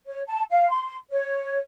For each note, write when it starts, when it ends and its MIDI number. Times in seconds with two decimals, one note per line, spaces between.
0.06 0.21 73
0.26 0.42 81
0.50 0.69 77
0.69 0.95 84
1.10 1.57 73